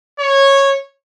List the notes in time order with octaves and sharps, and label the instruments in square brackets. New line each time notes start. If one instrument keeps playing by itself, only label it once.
[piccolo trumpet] C#5